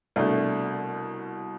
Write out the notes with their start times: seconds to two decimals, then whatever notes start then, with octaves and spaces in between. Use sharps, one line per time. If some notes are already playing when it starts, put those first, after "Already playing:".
0.16 C2 B2 A3 D4